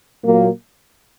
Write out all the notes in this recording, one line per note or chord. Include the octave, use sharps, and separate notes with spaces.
A#2 F#3 A#3